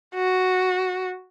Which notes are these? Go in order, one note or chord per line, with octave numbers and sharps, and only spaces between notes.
F#4